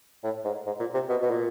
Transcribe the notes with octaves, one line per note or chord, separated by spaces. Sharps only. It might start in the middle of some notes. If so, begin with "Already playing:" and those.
A2
G#2
G#2
A#2
C3
B2
B2
A#2